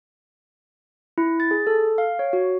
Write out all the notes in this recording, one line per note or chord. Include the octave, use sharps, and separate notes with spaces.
E4
A6
G#4
A4
F5
C#5
F#4